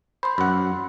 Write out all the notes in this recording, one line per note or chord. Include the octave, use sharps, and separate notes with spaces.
C5 B5 C6
F#2 F#5